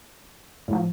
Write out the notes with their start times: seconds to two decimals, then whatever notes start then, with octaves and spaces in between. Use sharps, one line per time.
0.68 A2 F3